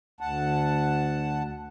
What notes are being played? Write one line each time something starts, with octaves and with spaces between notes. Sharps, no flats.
D2 F#5 A5